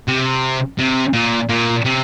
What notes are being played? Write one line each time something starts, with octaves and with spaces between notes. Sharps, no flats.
C3
C3
A#2
A#2
C3